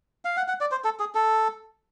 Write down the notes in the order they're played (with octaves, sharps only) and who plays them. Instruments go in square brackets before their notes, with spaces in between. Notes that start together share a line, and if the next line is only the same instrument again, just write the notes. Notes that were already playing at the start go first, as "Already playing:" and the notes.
[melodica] F5
F#5
F#5
D5
C5
A4
G#4
A4